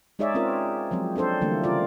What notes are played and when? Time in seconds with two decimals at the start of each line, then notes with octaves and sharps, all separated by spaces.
0.19 G#3 D#4 G#4 C#5 D5 E5
0.35 C4 C#4 F4 A#4
0.91 F3 F#3 G#3 C4
1.16 C4 D4 A4 C5 D5
1.41 D3 E3 G3 A3 A#3
1.64 C#3 F4 A#4 D5